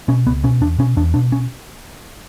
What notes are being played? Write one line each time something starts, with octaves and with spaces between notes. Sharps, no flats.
B2 C#4
C#2 B3
B2 C#4
E2 D4
B2 C#4
E2 D4
B2 D4
C#4